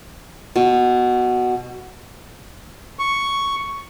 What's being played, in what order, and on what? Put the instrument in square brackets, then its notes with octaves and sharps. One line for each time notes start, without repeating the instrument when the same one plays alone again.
[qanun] B2
[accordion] C#6